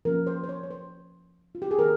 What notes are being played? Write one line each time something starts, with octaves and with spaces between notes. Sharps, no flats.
F3 A#3 C#4 A#4
C5
C5
C#5
C#5
C5
F4
G4
G#4
D#3 A#3 A#4